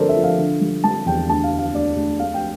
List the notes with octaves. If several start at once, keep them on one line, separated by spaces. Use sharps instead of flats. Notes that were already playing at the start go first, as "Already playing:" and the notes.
Already playing: G2 D3 F3 A4 A#4 C5 D5
E5
F3
F5
D3
G3
G3 A5
E2 G5
D2 A5
F5
D3
F5
D2 D5
D2
A3 F5
G5